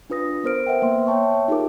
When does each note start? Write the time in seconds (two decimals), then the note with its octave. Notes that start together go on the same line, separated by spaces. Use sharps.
0.10 D4 F4 B4 D#6 A#6
0.44 B3 A#4 C5 F6 D7
0.67 B4 C5 E5 F#5 G5
0.82 A#3 B3 C6
1.07 C#5 E5 G5 A5 C#6
1.48 D#4 F4 G4 G#4 A#4 D6